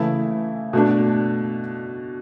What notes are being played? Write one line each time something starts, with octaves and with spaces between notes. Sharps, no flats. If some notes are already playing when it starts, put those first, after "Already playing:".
Already playing: C#3 E3 A3 E4
B2 A3 D4